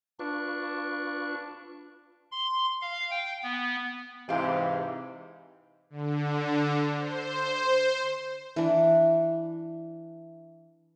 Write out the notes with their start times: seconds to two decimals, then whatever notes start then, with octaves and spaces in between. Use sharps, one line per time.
0.19 D4 F4 B4 C#6
2.32 C6
2.82 F5
3.11 G5
3.43 B3
4.29 G#2 C3 E3 G4 F5
5.90 D3
6.96 C5
8.56 E3 D4